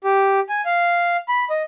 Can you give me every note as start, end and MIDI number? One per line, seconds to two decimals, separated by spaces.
0.04 0.40 67
0.49 0.61 80
0.65 1.17 77
1.28 1.45 83
1.50 1.63 75